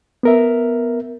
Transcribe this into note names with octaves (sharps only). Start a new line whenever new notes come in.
B3 A#4 E5